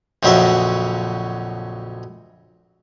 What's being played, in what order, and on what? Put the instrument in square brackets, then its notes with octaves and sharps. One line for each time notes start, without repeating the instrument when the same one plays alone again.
[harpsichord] A#1 F2 C#3 F#3 C#4 E5